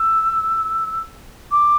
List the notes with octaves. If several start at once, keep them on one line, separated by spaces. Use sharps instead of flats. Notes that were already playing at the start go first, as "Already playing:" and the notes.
Already playing: E6
D6